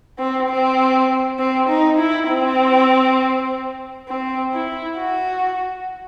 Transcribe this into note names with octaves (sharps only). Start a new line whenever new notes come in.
C4
C4
C4
D#4
E4
C4
C4
E4
F#4